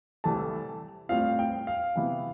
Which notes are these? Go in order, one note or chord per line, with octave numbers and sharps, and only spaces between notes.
C2 C3 E3 A3 A5
A2 G3 C4 F4 F5
G5
F5
C3 E3 B3 E4